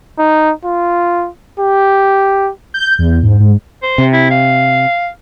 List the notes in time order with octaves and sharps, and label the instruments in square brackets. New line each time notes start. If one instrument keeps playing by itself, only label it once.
[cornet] D#4
F4
G4
[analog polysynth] G6
E2
G#2
G#2
[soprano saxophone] C5
[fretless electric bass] C3
[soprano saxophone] E4
F5